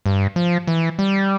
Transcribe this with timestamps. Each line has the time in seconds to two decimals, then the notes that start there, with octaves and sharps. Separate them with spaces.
0.06 G2
0.36 F3
0.67 E3
0.99 G3